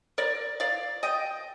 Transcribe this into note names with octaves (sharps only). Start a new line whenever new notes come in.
A#4 D5
D5 F5
D#5 G5